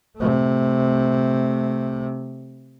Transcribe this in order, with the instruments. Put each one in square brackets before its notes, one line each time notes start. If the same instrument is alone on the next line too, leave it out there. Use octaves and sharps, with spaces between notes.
[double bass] C3 A3